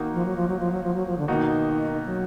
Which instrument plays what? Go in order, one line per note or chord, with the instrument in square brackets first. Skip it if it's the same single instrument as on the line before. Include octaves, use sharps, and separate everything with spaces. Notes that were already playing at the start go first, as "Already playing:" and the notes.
Already playing: [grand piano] D#3 A#3 D#4 F#4
[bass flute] F3
F#3
F3
F#3
F3
F#3
F3
F#3
F3
D3
[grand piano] B2 A#3 D#4 F#4 [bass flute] D#3
[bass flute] F#3